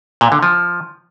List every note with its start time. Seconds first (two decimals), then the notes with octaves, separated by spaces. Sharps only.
0.21 A#2
0.32 D3
0.43 F3